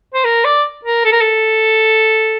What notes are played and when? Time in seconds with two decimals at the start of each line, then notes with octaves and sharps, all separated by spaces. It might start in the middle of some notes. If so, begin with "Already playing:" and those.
0.14 C5
0.24 A#4
0.45 D5
0.85 A#4
1.05 A4
1.12 A#4
1.21 A4